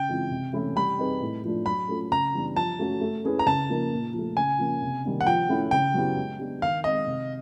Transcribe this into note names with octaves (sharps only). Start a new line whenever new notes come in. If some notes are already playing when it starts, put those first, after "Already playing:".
Already playing: C#3 G5
E3 G#3 C4 F4
C3
E3 A3 C#4 E4
G3 B5
C4 D#4 G#4 B4
A2
F3 A3 D4 F4
F#3 B5
A3 C#4 F4 A4
C#3 A#5
E3 G3 B3 D4
F3 A5
A3 C#4 F#4 A4
A3
C#4 E4 G#4 B4
A#5
C#3 A5
F3 A#3 D#4
A#2
F3 A3
C#3 G#5
F3 A#3 C#4
C3
D#3 G3 A#3 D4
F#5
F3 G5
A3 C#4 E4
C#3 G5
F#3 B3 E4 G4
G#3
B3 D4 G4
D#3 F5
G#3 C4 D#5
C3